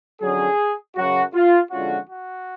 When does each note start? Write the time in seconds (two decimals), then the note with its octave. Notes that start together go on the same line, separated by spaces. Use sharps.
0.21 F2 D3 F#3 C#4 G#4
0.96 F#2 C#3 F#3 F#4
1.34 F4
1.71 F2 D3 G#3 C#4 F4 F#4
2.09 F#4